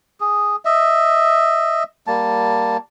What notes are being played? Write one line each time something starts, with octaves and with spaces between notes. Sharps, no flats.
G#4
D#5 E5
G3 A#3 A5